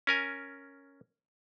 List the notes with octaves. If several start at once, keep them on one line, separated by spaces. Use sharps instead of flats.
C#4 A#4 G#5